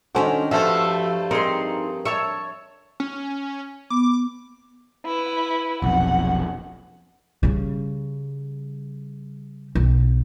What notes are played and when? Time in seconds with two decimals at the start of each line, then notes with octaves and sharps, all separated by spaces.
0.15 D#3 C#4 D4 F#4 A4 C5
0.51 G2 F3 A3 F#4 A4 C5 E5
1.31 C4 D#4 G#4 A#4 C6
2.05 C#5 E5 A5 C#6
3.00 C#4
3.90 B3 D6
5.05 E4 B4
5.82 F1 B1 F2 F#5
7.43 C#3 G3
9.75 B1